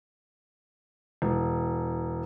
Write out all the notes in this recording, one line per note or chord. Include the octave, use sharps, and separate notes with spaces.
E1